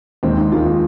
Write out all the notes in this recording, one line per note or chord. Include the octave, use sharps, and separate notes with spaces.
D#2 D#3 G#3 C4
D#4
D#2 D#3 G#3 F4
D#4